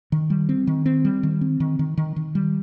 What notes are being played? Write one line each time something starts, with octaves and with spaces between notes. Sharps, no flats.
D#3
G3
C4
D#3
C4
G3
D#3
C4
D#3
D#3
D#3
D#3
G3